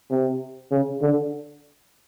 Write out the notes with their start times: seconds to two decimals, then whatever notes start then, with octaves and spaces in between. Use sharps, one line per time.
0.10 C3
0.71 C#3
1.01 D3